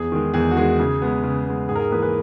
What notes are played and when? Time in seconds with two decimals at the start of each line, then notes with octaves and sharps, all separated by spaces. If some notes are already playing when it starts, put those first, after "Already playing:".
Already playing: E2 G#4
0.12 D#3 G#3
0.34 E2 G#4
0.51 F#4
0.57 D#3 G#3 G#4
0.79 C#3 G#4
1.02 G#3 B3
1.23 C#3
1.47 G#3 B3
1.69 G#2 G#4
1.75 A#4
1.80 G#4
1.91 E3 A#3 G#4 B4
2.02 G#4 B4